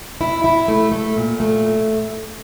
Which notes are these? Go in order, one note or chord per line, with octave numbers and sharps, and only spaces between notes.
E4
E4
A3
A3
A#2
A3